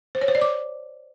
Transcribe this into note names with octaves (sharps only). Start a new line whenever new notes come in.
C5
C#5
C5
D5
D6